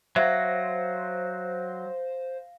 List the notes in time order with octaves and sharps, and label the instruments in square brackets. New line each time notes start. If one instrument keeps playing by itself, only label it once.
[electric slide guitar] F#3 [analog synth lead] C5 [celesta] E5 [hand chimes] F5 A#6 C7